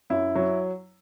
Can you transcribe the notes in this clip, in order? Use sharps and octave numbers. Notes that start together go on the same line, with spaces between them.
F#2 E4
F#3